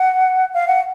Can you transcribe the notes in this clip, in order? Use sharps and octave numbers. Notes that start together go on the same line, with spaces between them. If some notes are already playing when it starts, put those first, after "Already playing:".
Already playing: F#5
F5
F#5